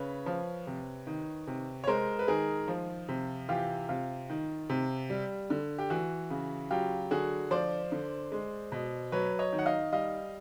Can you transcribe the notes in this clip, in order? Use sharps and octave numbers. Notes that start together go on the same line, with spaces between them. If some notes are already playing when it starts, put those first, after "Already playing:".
Already playing: C#3 B4 C#5
F3
C3
D#3
C3
C#5
G#3 A#4 C5
B4
D#3 G#4 A#4
F3
C3
E3 F4 G4
C3 F4
D#3
C3
G3
D3
G4
E3 F#4
C#3
F#3 F4 G4
D3 F#4 G#4
F3 C5 D5
D3
G#3
B2
F#3 B4 C#5
C#5 D#5
D#3
F#5
D#5 F5
G3 D#5 F5